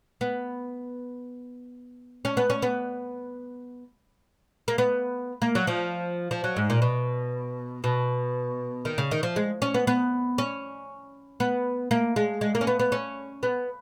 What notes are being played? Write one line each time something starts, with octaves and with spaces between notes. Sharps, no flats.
B3
C#4
B3
C#4
B3
A#3
B3
A#3
F#3
F3
F3
F#3
G#2
A#2
B2
B2
D#3
C#3
D#3
F3
G#3
C#4
B3
B3
C#4
B3
A#3
G#3
G#3
A#3
C#4
B3
B3
C#4
B3